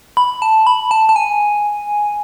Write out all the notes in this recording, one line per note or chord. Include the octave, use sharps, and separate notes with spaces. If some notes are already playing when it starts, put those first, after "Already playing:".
B5
A5
B5
A5
A5
G#5